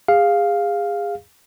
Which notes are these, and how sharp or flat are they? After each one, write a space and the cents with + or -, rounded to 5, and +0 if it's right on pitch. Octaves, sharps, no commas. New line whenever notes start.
G#4 -30 F5 +5